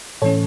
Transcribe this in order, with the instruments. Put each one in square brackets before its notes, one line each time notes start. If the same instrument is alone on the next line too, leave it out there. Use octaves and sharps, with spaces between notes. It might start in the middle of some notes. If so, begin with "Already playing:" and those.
[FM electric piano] A2 E3 A3 C#4 A4 C#5